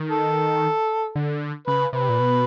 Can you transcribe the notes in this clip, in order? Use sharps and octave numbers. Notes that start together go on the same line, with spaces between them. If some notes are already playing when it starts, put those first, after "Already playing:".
Already playing: D#3
A4
D3
C#3 B4
C3 B4
A#2
B2